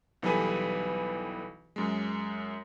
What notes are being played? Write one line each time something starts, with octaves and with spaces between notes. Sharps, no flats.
B1 E3 G3 A4 B4 G#5
F#2 G#3